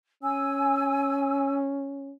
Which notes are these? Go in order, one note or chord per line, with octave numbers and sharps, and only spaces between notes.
C#4 G#5 E6